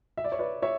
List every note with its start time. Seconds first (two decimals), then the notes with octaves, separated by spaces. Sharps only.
0.17 E5
0.24 D5
0.32 C#5
0.39 B4 D5
0.62 C#5 E5